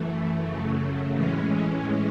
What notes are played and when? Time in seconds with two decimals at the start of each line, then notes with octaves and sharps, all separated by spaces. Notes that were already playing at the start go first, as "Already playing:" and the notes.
Already playing: F#2 E3 A3
0.44 F#2 C#3 F#3 A3
1.14 A2 E3 G#3 C#4